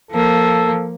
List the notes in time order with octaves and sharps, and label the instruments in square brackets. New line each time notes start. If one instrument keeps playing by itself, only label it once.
[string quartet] F3 A#3 [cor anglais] A4